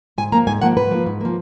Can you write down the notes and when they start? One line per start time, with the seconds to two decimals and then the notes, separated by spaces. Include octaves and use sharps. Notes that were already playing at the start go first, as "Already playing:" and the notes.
0.18 G#2 G#5
0.32 F3 A#3 A#5
0.47 G#2 G#5
0.62 F3 A#3 F#5
0.77 G#2 B4
0.91 F3 A#3
1.06 G#2
1.21 F3 A#3